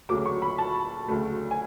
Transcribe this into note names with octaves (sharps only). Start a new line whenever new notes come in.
D2 C#3 F#3 A3 D6
C#6
B5
A5
D2 C#3 F#3 A3
G#5